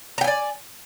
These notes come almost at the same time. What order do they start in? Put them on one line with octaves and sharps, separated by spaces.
A#5 G5 G#5 D5